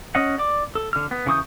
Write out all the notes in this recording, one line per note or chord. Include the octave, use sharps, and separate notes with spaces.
C#4 D#5 F#5
D5 D6
A4
D3 F6
B3
C#3 E3 C#6 D#6 G6